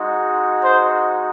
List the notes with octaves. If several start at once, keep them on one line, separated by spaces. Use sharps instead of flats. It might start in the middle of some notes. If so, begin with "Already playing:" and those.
Already playing: G#3 D#4 F#4
C5